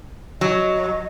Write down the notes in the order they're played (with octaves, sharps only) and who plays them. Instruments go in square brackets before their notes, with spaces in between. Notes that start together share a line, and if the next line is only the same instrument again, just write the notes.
[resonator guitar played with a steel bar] F#3 [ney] D#5